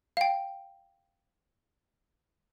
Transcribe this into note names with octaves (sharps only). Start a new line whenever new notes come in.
F5 G5